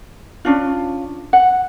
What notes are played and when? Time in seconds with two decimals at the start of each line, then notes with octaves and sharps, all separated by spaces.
0.45 C#4 D4 F4
1.33 F#5